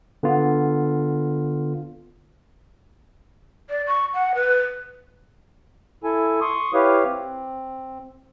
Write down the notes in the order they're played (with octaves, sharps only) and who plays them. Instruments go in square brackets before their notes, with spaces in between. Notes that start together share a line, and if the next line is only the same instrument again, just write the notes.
[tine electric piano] D3 B3 F4
[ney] D5
C#6
F#5
B4
[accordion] E4 A4 G#5
C6 C#6 D#6
E4 G4 B4 C#5 F5
C4